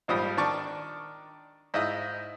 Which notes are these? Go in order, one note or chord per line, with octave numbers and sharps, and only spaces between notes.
A#1 G#2 F3 G3 F4 D#6
D#3 D4 D5 A5 C#6 D6
G#2 E4 F4 D#5 E5 D#6